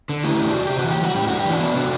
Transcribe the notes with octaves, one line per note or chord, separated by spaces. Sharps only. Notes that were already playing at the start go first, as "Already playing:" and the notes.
D3
A3 E4 G4
D4
C3 F#4
C3 G4
F#4
E3
G4
G3 F#4
A2 G4
D4 F#4
G4
E3
D4 F#4
B3
C3 D4 F#4